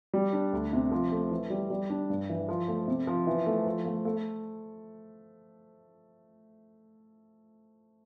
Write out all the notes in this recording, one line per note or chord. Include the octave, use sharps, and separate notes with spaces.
G3
D4
D2
C3
F3
A3
E3
G3
G3
D4
G2
E3
F3
A3
C3
F3
E3
A3
F3
A3
A3